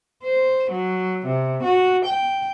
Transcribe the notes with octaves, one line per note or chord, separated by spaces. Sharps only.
C5
F#3
C3
F#4
G5